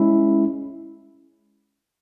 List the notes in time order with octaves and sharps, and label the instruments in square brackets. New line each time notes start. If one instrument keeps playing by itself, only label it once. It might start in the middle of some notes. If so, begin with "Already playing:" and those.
Already playing: [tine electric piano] G#3 C#4 E4